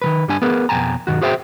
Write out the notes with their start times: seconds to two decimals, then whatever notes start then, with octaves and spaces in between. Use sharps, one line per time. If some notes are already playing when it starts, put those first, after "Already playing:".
0.02 D#3 E3 B4
0.28 G2 G3 D4 G#5
0.42 B3 G#4 A#4 B4
0.69 F2 B2 E3 G5 G#5 A#5
1.07 B1 E2 G2 D#3 F#4
1.21 F#4 G#4 C5 E5 F5 G5